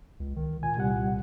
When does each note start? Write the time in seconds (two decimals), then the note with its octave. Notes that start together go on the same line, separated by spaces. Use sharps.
0.20 C#2
0.36 D#3
0.63 A#2 G#5
0.76 C2 G3 F#5